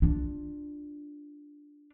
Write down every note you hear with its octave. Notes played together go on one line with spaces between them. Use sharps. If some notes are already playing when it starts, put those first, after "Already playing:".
D4 F4